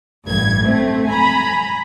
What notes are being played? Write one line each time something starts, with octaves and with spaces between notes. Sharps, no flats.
A1 G2 G#6
A3 C4
G#5 A#5 B5